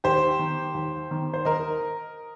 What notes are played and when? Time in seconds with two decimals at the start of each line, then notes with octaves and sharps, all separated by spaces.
0.04 D#2 G4 C5
0.39 D#3
0.75 D#2
1.11 D#3
1.33 C5
1.45 D#2 A#4 D#5